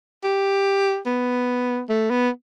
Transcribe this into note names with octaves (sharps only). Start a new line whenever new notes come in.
G4
B3
A3
B3